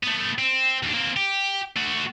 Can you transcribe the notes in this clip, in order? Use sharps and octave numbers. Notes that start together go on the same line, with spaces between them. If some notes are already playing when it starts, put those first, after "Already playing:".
A3 B3
C4
D#2 D4
A#3 C4
G4
A3 F#4